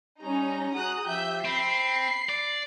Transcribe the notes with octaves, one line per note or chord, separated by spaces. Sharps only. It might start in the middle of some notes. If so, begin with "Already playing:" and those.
G3 C#4 D#4 A#5
F#4 G#4 A#5 D#6 F#6
F3 G4 E5 G6
C4 B5 C7
D5